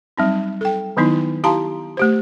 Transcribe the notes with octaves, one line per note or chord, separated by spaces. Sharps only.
F#3 G3 C4 D#4
A4 G5
D#3 F#3 B3 D#4 E4
E4 G4 F5 A5 A#5 C6
A3 G4 C5